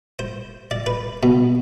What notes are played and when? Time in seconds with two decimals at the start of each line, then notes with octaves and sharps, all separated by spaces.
0.19 C5
0.71 D5
0.86 B4
1.23 B2